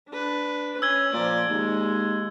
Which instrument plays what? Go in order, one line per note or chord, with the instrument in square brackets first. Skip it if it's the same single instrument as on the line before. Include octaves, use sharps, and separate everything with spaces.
[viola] D4 B4
[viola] C#4 [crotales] E6 G#6 G7
[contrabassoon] A#2 [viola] F3 D5
[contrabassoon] D#2 [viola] G#3